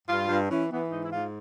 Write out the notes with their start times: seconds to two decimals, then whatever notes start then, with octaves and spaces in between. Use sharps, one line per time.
0.08 G2 F4
0.28 G2
0.50 E3 C#4
0.70 E3 B3
0.90 G#2 D#4
1.04 E4
1.11 G#2 F4